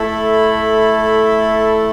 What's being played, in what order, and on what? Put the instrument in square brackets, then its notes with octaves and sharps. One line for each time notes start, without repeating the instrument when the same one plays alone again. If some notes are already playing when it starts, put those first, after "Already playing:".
Already playing: [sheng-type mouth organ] A3 E4 A4 B5